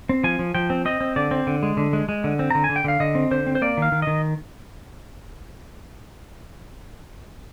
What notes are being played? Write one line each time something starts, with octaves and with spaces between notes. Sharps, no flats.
C4
F3 G#5
F3
F3 G5
C4
C4 D#5
C4
D3 D5
C4
D3
G#3
D3
G#3
G#3
D3
C4
D3 A#5
G#5
D3
G5
D3 F5
D3 D#5
C4
D3 C5
C4
C5
A#3 D5
D#3 F5
D#3
D#3 D#5